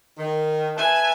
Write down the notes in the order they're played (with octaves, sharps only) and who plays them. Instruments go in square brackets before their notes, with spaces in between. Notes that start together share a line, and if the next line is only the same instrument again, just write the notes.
[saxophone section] D#3
[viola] B4 G#5 [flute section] E5 A5